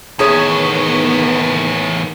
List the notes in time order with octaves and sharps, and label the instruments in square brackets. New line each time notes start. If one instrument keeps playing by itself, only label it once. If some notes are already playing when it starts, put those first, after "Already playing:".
[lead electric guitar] E2 A2 [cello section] D#3 B3 [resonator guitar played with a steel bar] C#4 G#4 C#5